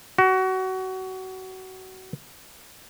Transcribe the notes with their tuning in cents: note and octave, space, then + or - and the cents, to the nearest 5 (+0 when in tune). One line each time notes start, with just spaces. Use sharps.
F#4 +25